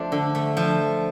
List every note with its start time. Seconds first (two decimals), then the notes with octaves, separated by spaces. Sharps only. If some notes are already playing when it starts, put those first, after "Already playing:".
Already playing: F3 A3 D4
0.12 D3
0.35 A3
0.57 F3